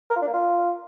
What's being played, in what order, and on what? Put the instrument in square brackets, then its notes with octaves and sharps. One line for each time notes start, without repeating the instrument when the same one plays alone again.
[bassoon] A#4
F4
D4
A#3
F4